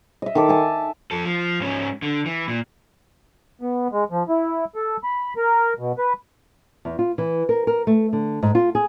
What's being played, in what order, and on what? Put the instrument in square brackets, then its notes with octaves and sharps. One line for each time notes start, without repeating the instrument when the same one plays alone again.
[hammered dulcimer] D#5 E5
D#3 A4 D6
E5 G#5 A5
[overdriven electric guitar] F2 A4
F3
G#2 C#4
D3
E3
A#2
[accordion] B3
G#3
F3
E4
A4
B5
A#4
B2
B4
[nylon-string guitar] E2
F4
E3
A#4
A#4
A3
D3
G#2
F4
G#4